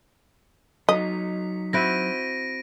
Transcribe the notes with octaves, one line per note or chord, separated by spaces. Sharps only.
F#3 D#4 D#5 B6
C4 E4 F#4 A#6 D7 D#7